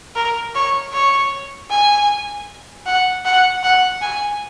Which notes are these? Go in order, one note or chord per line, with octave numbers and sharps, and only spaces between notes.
A#4
C#5
C#5
G#5
F#5
F#5
F#5
G#5